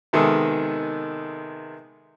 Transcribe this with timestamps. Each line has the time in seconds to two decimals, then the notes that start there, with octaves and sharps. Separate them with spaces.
0.13 C3 D#3 G#3 B3 G#4 A4